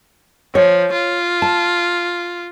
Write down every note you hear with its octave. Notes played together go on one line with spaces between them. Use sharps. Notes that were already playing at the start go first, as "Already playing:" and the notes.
F3 C#5
F4
A5